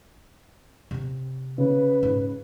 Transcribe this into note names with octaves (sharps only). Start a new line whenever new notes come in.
C3 C4
C#3 B4
G#2